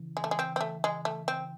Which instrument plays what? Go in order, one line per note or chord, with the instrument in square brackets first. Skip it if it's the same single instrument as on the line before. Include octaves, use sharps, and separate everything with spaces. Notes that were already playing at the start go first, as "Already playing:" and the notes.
Already playing: [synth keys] C#3 E3
[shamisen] G#3
A3
G#3
C4
C4
A3
G#3
A3
C4